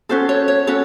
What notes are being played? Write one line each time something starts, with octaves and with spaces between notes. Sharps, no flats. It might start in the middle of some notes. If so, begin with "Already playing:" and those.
C#4 F#4 A4 C5
C#5
C#5
C#4 F#4 A4 C#5